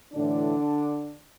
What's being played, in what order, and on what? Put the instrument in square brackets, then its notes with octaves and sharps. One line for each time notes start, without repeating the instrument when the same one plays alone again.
[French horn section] A2 D3 E3 D4